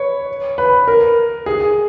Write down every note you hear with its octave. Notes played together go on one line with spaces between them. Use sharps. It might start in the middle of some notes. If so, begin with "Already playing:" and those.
Already playing: B4 C#5
B4
A#4
G#4